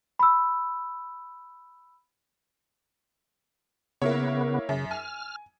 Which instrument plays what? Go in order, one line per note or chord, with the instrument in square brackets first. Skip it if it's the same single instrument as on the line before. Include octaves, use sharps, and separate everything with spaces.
[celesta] B5 E6
[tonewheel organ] C#3 B3 [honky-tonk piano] A#3 E4 C#5
[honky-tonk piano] F#2 [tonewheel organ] C#3
[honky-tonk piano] G#5 [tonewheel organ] F6